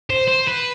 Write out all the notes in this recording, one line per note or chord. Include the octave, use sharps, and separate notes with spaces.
C5
C5
B4